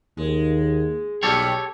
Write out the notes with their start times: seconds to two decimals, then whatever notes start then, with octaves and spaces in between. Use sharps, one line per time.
0.17 D#2 G#3
1.23 B1 G3 A3 G4 A4 C#5